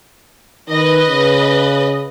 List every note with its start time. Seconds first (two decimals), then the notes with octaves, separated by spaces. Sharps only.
0.68 D#3 B4 D#5
1.07 C#3